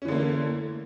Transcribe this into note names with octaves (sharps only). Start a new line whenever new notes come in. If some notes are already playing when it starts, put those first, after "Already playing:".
D3 E3 A3 A#3 C#4